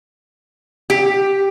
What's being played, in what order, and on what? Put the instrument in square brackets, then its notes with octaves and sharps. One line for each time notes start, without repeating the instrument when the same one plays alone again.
[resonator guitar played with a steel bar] G4